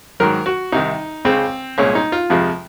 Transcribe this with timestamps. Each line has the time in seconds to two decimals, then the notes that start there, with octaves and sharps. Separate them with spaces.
0.20 G#2 D#3 F#3 A#4
0.46 F#4
0.72 C2 C3 D#3 D#4
1.25 C#2 C#3 G#3 C4
1.78 C2 A#2 G#3 C#4
1.95 D#4
2.12 F4
2.30 F2 C3 F3 G#3